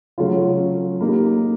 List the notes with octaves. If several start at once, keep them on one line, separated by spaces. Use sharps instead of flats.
C#3 F#3 A3 C#4 F4
A#3 D#4 G4